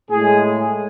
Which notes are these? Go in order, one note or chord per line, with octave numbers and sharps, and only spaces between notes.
A2 G#3 G#4